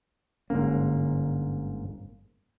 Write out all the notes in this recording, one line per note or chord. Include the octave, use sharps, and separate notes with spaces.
G1 G#2 D3 A#3 C#4